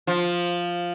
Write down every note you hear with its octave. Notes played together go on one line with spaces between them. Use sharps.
F3